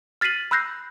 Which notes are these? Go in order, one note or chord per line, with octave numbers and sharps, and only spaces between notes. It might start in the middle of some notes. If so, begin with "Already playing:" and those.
F6 A6 B6 C7 D#7 F#7
B5 E6 F#6 G6 A#6 C7